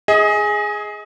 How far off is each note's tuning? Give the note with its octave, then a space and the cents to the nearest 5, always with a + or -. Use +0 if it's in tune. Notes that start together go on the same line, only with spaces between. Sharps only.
G#4 +0 D#5 +30